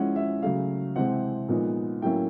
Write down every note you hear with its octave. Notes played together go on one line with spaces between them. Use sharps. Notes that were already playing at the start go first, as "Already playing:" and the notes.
Already playing: F3 G#3 C#4 E4 F#5
E5
C#3 F#3 A3 F5
C3 E3 G#3 C4 F#5
A#2 F3 G#3 B3 D#4
A2 F#3 A#3 C#4 E4 G5